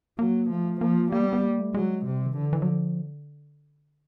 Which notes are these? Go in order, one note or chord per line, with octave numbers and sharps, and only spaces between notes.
F#3 A#3
F3 A3
F3 A#3
G3 A#3
B3
B3
A#3
A3
F#3 G#3
C3 G3
D#3
D3 E3
E3
F#3
F3